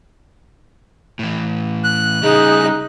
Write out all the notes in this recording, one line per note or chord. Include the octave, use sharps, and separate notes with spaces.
A2 E3
F#6
C#3 G3 D#4 G#4